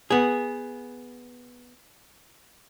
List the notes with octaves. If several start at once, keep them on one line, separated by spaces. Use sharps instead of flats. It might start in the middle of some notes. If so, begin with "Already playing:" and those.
B3 G#4